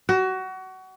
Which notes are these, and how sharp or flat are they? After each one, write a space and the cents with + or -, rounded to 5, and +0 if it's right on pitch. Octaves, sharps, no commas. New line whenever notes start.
F#4 +25